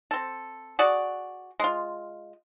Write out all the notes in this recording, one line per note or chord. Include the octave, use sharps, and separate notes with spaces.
C4 A4
F#4 G#4 D5
G#3 F4